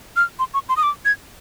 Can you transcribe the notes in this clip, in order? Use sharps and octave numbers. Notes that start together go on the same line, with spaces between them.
F6
C6
C#6
C6
D#6
D6
G#6